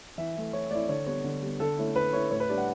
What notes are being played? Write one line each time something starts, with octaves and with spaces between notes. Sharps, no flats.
E3 E5
A3 E4
E3 C#5
A3 E4 D5
D3 C#5
G3 B3 C#5
D3
G3 B3
D3 A4
A3 C#4 E4
D3 B4
A3 C#4 E4 C#5
A2 C#5
B4
G3 D4 D5
F#5